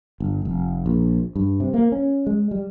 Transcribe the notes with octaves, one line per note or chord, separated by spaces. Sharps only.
G1
F1
A#1
G2
C3
A#3
C#4
G#3
G3